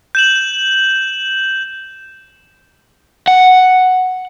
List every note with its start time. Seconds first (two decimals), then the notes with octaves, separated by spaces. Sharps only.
0.15 G6 E7 F#7
3.28 F#5